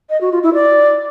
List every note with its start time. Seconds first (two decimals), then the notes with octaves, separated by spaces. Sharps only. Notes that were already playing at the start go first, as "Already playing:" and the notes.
0.10 D#5
0.21 F#4
0.32 F4
0.43 E4
0.54 D5